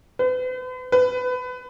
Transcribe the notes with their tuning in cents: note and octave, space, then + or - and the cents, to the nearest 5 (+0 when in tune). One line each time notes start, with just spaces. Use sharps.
B4 +45
B4 +25